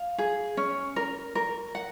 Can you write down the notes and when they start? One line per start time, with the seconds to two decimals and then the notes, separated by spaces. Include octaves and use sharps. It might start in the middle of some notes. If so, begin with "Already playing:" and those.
Already playing: F5
0.18 G#4
0.57 C#4
0.96 A#4
1.35 A#4
1.75 F#5